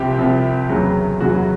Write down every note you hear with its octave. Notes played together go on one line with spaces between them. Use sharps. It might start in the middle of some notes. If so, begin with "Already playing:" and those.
Already playing: C2 C3 F3 G4
C2 C3 F3
E2 C#3 F#3
E2 C#3 F#3 F#4